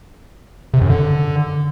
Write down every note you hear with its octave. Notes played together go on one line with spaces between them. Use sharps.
C3
F#2
D3